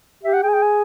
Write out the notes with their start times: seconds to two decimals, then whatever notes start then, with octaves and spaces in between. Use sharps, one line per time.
0.23 G4 E5
0.33 F#5
0.43 G#4 G5
0.49 G#5
0.54 G5
0.62 G#5